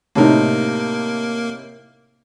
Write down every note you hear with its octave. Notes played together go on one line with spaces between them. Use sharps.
A2 C3 A#3 D#4 A#4